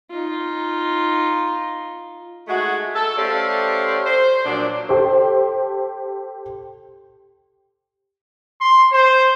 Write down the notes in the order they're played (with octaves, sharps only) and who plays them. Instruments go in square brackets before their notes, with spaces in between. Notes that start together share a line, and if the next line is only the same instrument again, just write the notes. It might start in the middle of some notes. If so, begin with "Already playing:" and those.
[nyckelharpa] D#4 F4
[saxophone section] G#3 A3 D#4 F#4
A4
A3 C#4 G4 C5 D5 F5
C5
A#2 F3 F#3 D4
[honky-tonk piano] G4 A4 C5
[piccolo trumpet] C6
C5